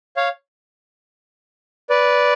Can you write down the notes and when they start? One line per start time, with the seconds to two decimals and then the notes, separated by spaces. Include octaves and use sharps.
0.16 C#5 F5
1.90 B4 D5